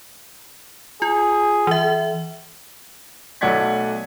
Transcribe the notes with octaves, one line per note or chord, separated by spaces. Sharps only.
F4 G#4
E3 E5
B1 A3 D5 F#5 G#6 B6